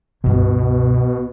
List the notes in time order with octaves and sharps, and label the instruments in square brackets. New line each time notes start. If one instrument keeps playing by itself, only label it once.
[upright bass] C#2 G2 [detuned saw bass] B2